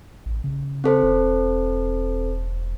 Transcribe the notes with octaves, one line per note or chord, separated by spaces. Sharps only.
A1
C#3
C4 A4 C5
E1